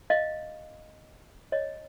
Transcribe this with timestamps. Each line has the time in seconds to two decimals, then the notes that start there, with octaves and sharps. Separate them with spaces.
0.10 D#5 F5
1.52 C#5 D#5